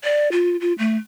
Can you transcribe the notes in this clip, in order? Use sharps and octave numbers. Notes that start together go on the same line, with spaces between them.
D5
F4
F4
A3